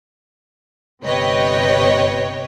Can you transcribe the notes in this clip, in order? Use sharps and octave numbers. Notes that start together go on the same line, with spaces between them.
G1 C3 B4 C#5 D#5 G5